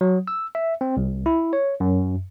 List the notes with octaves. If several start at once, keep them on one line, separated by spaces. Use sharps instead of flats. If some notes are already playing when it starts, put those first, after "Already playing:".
F#3
E6
E5
C4
C2
E4
C#5
F#2